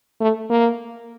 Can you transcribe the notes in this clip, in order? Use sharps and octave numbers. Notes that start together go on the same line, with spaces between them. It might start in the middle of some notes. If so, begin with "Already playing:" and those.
A3
A#3